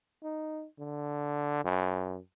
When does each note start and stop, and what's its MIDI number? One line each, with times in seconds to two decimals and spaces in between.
0.23 0.66 63
0.79 1.62 50
1.64 2.19 42